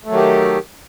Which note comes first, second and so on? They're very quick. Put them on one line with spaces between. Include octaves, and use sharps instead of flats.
A3 F#3 D#3 G4